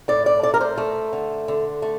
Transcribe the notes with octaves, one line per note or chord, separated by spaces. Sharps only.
A2 D5
D5
A3 D5
A#4
C5
A3
D3
D3
A3